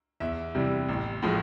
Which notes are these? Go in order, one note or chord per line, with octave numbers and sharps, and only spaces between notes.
E2 E5
C3 E3 G3
A1
A2 F3 G#3